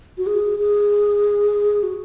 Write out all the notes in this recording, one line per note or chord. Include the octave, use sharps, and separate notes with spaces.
F#4
G#4
G#4
F#4